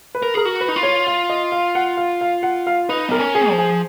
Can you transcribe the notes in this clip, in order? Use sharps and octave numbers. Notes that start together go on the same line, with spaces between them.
B4
A#4
G#4 A#4
F#4
B4
D#4
F4
C#5
F5
D#5
F5
F#5
F5
F5
F#5
F5
D#4 B4
B3 A#4
C#4
G#4
F3
G#4